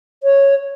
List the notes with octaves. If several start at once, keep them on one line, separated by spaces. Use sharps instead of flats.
C#5